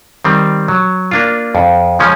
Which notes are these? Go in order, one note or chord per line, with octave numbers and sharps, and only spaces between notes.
D#3 G3 C4
F#3
A#3 D4 F4
F2
C#3 F3 G#3 C#4